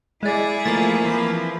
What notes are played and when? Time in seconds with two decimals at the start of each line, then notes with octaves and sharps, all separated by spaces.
0.23 G#3 E4 G#4 D5
0.65 F3 A3 A#3 A6
1.04 E3 F3 C4 E4